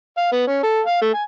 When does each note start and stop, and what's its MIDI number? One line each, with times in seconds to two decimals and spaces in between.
0.18 0.31 77
0.32 0.45 59
0.47 0.62 61
0.63 0.81 69
0.87 1.01 77
1.02 1.10 57
1.14 1.23 80